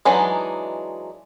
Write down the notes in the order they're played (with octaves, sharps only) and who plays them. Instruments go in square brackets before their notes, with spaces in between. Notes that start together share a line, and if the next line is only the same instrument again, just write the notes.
[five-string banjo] E3 F#3 G#3 D4 D#4